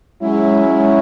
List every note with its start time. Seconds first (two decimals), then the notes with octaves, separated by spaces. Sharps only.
0.19 F#3 G#3 C#4 E4